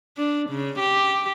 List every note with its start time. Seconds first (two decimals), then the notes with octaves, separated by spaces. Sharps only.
0.17 D4
0.50 C#3
0.79 G4